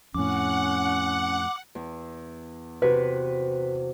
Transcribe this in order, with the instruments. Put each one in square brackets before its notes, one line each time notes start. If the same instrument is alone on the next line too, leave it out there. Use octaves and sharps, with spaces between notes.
[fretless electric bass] F2 A2 [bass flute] C#4 [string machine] F#5 [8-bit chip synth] D6
[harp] E2
[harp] C3 F#4 [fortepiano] B4